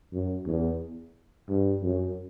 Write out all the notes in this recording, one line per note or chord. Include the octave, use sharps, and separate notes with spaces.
F#2
E2
G2
F#2